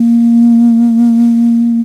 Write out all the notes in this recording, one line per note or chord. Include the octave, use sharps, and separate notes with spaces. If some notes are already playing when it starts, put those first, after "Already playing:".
Already playing: A#3